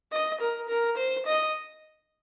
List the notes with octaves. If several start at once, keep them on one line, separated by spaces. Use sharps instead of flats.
D#5
A#4
A#4
C5
D#5